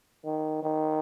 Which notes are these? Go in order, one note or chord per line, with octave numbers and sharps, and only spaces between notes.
D#3
D#3